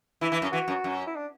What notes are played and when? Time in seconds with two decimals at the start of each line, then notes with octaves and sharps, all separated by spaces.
0.21 E3 E4
0.32 E3
0.42 F#2
0.52 E3 F#4
0.68 F#2
0.84 F#2
1.07 E4
1.16 D4